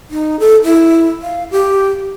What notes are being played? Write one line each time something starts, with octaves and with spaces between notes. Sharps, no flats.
D#4
A4
E4
F5
G4